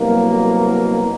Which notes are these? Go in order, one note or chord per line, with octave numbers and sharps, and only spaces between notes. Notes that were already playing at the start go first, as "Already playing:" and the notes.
Already playing: C2 B2 F#3 A#3